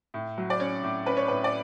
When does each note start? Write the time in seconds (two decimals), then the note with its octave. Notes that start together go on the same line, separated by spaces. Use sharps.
0.14 A2
0.38 F#3
0.50 D5
0.60 C#4 C#5
0.83 A2
1.06 C#4 B4
1.17 C#5
1.28 A2 B4
1.44 D5